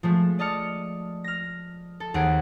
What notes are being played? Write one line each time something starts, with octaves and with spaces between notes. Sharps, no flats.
F3 G#3 A3
D5 D#5 A5 F6 C#7
F6 A#6
A4
D#2 C4 G#4 F#5 D7